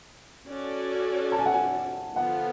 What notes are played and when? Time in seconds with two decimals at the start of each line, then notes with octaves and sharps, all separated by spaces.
0.47 C#4 F#4 A4 D5
1.32 A5
1.39 G#5
1.46 F#5
1.53 G#5
2.16 D3 F3 B3 F4 A4 F#5